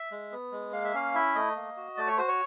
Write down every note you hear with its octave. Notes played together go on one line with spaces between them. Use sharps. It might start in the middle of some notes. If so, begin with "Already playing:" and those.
Already playing: E5
G#3
B3
G#3
A#3 F5
E5
C#4 F5
E4 E5
A3 D#5
A#3
F#4
A3 D5
C#5
F#4 C5
C#5